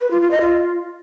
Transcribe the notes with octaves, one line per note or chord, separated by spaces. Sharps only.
B4
F4
F4
D#5
F4